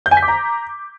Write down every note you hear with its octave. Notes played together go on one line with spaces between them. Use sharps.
G6
G#5
B6
D6
A#5